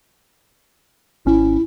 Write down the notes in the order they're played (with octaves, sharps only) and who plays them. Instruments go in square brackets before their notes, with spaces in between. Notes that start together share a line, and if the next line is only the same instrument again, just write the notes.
[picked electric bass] G#1 C#4 [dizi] E4